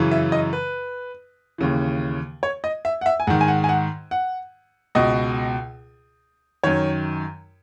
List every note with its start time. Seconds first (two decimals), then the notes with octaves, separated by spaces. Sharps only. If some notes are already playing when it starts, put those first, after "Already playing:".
Already playing: F#2 C#3 E3
0.11 E5
0.32 D#5
0.53 B4
1.58 D#2 C#3 E3
2.43 C#5
2.64 D#5
2.85 E5
3.01 F#5
3.06 E5
3.20 G#5
3.27 G#2 D#3 F#5
3.41 G#5
3.48 F#5
3.64 G#5
3.69 F#5
4.11 F#5
4.95 C#2 B2 D#5
6.63 F#2 D#3 C#5